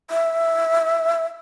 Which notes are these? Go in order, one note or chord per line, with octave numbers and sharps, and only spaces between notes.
E5